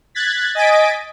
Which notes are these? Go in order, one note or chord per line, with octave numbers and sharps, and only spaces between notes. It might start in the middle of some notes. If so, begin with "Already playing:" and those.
F#6 G#6 A6 B6
D#5 G#5 A6 B6 D7